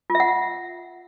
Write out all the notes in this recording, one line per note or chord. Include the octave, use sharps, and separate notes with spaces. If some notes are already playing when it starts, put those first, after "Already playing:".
F4
E5
F#5